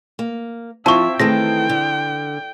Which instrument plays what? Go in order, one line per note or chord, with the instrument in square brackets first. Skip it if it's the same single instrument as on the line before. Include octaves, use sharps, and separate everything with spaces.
[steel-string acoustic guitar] A#3
[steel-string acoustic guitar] F3 [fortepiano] C4 E4 F4 [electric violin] E5 [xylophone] A5 C#6
[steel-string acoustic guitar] D#3 E3 A3 [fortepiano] C4 G#4 A5 [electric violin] G5 [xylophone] A#6
[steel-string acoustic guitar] D3